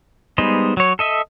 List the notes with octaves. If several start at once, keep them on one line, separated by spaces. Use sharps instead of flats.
G3 G#3 B3 D#4 C5
F#3 C#5
A4 D#5 E5